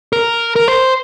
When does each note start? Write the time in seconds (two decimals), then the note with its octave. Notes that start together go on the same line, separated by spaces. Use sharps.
0.13 A#4
0.56 A#4
0.68 C5